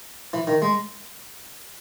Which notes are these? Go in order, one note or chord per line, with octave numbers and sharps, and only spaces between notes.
E3
D#3
G#3